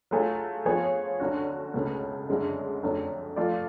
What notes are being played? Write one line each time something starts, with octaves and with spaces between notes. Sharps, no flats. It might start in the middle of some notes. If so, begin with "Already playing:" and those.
F#3 A3 F4 G#4
F3 B3 F4 G#4 C#5
D2 D3 F#3 C#4 F#4
C#2 B2 A3 C#4
F#2 D3 G#3 C#4
F2 D3 F#3 A3 C#4
F3 A3 F4 A4 D5